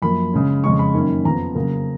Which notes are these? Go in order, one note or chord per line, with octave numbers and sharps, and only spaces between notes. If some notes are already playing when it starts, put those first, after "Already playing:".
F#2 F3 A#3 B5
C#3 G#3 C#4
F2 C#3 G#3 C#4 C#6
B5
F#2 D#3 A#3 C#4
F2 F3 B3 A#5
C#3 F#3 A#3 C#4